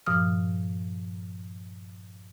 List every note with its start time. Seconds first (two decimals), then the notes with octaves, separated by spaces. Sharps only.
0.06 G2 A#2 F3 D#6 F6